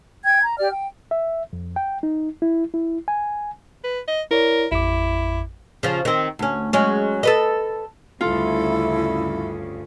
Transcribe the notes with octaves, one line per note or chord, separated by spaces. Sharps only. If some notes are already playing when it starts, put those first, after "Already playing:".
G5 G#6
A#5
G4 D5 F6
G5
E5
F2
G5
D#4
E4
E4
G#5
B4
D#5
E4 A#4 C#5 D5
A1 F2 E4 D6
C#3 F3
D#3 C4
D2 C#4
F#3 G#3 C#4
A4 B4 D#5
D2 G2 C#3 E4 F4 A4